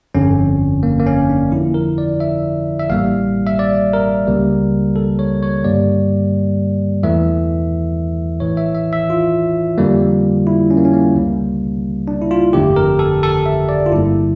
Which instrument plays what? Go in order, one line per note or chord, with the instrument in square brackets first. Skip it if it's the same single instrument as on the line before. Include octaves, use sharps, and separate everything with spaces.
[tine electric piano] G1 F2 D3 C#4
A#3
A#3
C#4
D4
F2 D3 F3 E4
A#4
D5
E5
E5
A1 A2 G3 A#3 F5
E5
D5
A#4
C#2 C#3 G3 A#3
A4
C#5
C#5
G2 D3 G3 A#3 D5
E2 E3 A3 E5
A#1 A2 E3 C#5
E5
E5
E5
F4
F2 D3 G3 A#3
E4
C#4
A#3
C#4
A#3
C#2 C#3 G3 A#3
D4
E4
F4
G1 F2 D3 A3 G4
A#4
A4
A4
E5
D5
F4
G1 G2 D3 G3 A#3 E4